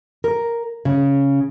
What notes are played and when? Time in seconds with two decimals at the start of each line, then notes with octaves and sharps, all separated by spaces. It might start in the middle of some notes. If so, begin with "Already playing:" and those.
0.24 A#4
0.85 C#3